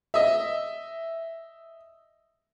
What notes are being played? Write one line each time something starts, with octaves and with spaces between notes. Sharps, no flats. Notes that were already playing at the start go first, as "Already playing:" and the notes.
D#5 E5